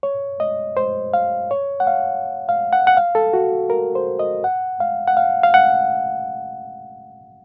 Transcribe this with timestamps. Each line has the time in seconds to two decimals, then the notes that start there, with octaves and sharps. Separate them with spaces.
0.03 C#5
0.40 D#5
0.77 C5
1.14 F5
1.51 C#5
1.80 F#5
1.87 F5
2.49 F5
2.73 F#5
2.87 F#5
2.97 F5
3.15 A4
3.34 F#4
3.70 A#4
3.95 C5
4.19 D#5
4.44 F#5
4.80 F5
5.08 F#5
5.17 F5
5.43 F5
5.54 F#5